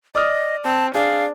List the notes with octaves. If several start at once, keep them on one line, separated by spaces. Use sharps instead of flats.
D5 D#5 D#6 F6
C4 A5
D4 G#4 F5